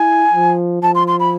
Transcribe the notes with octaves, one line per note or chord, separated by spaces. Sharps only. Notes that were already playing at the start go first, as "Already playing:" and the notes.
Already playing: E4 G#5
F3
F3 A5
C6
C6
B5